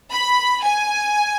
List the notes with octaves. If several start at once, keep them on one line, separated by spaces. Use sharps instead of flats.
B5
G#5